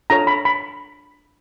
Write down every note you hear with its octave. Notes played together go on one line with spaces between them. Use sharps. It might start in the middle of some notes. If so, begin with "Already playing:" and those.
D4 F4 A4 C#5 A#5
B5
B5